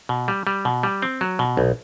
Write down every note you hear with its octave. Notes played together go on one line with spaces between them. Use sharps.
B2
G3
G3
B2
G3
C4
F#3
B2
B1